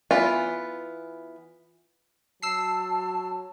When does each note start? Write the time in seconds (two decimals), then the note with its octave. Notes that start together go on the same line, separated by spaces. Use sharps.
0.11 E3 B3 F4
2.43 F#3 A5 E6 C7